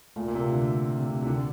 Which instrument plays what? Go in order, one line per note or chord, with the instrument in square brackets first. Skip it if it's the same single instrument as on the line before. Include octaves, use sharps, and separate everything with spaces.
[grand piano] A#2 [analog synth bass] A3
[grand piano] A#2
C3
D3
C3
C3
D3